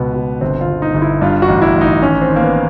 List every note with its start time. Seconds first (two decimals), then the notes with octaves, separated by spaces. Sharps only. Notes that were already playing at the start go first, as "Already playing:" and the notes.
Already playing: C#2 B2 B3
0.14 B2
0.41 G1 C4
0.61 F4
0.67 G1
0.82 D#4
0.94 G1
1.02 E4
1.21 G2 F4
1.42 F#4
1.48 A1
1.62 E4
1.76 A1
1.81 D#4
2.02 D#3 C#4
2.22 C4
2.29 D#3
2.36 A#3
2.42 B3